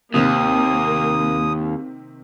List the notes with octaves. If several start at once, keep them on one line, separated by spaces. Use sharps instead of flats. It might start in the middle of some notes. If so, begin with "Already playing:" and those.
D#2 C3 D#3 A#3 C4 D#6